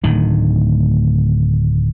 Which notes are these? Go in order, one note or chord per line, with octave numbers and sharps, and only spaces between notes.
D1 D2 D#3